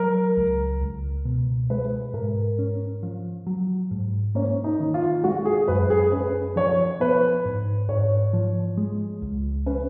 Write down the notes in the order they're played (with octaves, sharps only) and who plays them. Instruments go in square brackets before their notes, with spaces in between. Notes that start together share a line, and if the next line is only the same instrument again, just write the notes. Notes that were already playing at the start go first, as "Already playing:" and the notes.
Already playing: [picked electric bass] F#3 [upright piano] A#4
[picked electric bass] C#2
C#2
B2
[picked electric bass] G#3 [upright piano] B4
[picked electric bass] G#2 [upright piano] A#4
[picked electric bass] C#4
F3
F#3
G#2
[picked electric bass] A#3 [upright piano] C#4
[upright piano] D#4
[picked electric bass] D#3
[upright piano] F4
[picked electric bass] G#3 [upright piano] F#4
[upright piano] G#4
[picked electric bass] F#2 [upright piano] B4
[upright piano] G#4
[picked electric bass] C#4 [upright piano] B4
[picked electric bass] F3 [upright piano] C#5
[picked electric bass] B3 [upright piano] B4
[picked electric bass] G#2
[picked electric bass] G#2 [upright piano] C#5
[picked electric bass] F3
G#3
C#2
[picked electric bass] C#4 [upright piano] B4